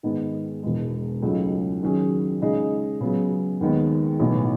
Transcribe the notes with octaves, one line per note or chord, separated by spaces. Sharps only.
G#2 D#3 G#3 B3 D#4
E1 E2 B2 G#3
C#2 C#3 F#3 A3 D#4
D#3 F#3 C#4 G#4
C#3 G#3 D#4 G#4
C#3 F#3 B3
D#2 D#3 G#3 B3
B1 A2 E3 B3